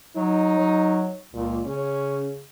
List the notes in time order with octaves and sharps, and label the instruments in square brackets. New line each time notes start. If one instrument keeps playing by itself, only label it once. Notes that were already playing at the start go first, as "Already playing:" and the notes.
[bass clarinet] F#3 [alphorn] D#4
[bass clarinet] F#3
[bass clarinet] C#2 [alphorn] A#2
[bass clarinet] C#3 [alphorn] C#4